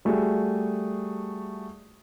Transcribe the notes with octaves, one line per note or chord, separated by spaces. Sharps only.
G3 A3 F#4 G#4